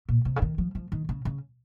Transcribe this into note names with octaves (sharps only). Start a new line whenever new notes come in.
A#2
C3
C#3
D#3
F3
F3
D#3
C#3
C#3